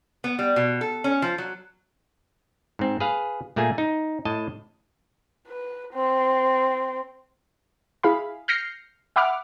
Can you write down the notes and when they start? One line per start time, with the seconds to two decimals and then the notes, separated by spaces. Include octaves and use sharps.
0.24 B3
0.39 G3
0.56 B2
0.81 A4
1.04 C#4
1.22 F3
1.38 F#3
2.79 G#2 C4
3.00 G#4 B4 F5
3.56 A#2 A3 A#3 G#4 G#5
3.78 D#4
4.25 A2 D#5 A5
5.48 B4
5.94 C4
8.03 E4 G#4 F5 B5
8.48 F6 G6 A#6 C7 C#7
9.16 E5 F#5 B5 D6 F6